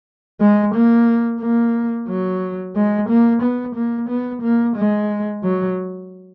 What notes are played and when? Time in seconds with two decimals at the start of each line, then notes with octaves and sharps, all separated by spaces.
0.41 G#3
0.74 A#3
1.41 A#3
2.08 F#3
2.76 G#3
3.09 A#3
3.42 B3
3.75 A#3
4.09 B3
4.42 A#3
4.76 G#3
5.43 F#3